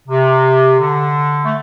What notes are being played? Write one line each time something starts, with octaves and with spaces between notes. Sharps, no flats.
C3
D3
A3